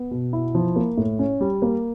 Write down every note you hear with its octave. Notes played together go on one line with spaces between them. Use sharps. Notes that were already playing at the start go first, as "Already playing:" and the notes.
Already playing: B3
B2
E4
F3
A#3
A2
C#4
G3
A#3